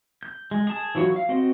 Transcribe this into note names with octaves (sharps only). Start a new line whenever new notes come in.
G6
G#3
G#4 A5
E3 F#3 F4 F#4 C#5
F5
C4 F#4 C5 D#5